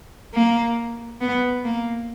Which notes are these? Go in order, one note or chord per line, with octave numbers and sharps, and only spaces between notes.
A#3
B3
A#3